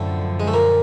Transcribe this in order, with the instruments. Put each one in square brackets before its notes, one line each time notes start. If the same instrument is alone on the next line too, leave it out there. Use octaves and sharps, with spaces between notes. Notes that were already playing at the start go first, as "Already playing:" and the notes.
Already playing: [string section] F#2 D3 F3 [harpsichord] A2 A3
[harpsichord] G#3
A3
A#2 A#3